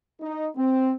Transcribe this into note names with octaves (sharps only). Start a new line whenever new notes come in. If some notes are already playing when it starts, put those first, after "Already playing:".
D#4
C4